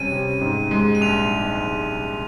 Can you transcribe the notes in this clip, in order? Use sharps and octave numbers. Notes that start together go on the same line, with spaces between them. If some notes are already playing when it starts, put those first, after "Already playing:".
Already playing: C3 G3 C#4 D#7
C3
G#2
G#3
D#7
A#1 F7